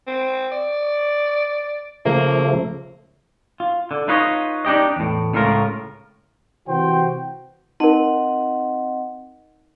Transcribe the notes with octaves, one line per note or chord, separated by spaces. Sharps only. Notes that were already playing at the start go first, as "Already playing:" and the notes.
C4
D5
C#3 F3 A3 A#3
F4
D3
D#4 F4 B4 C#5 D#5
D4 D#4 G4 D#5
E2 A2
C#2 A2 C#3 F4 A#4
C3 E3 F#4 C5 G5
C4 D#4 A#4 D#5 F#5